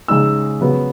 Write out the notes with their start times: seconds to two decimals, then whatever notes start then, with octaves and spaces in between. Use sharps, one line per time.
0.08 C#3 G#3 D#4 E6
0.61 C#3 F#3 B3